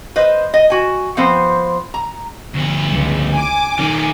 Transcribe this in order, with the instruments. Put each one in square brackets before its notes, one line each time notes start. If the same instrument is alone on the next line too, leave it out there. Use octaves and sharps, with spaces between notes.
[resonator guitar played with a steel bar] B4 C5 D#5
D#5
F#4 G#5
F3 B3 C4 C5
A#5
[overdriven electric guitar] D2 B3
[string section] C#2
G#5 D6
[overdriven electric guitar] D#3 C#4